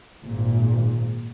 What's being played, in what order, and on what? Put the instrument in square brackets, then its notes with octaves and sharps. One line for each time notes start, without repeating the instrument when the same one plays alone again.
[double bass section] G#1 A#2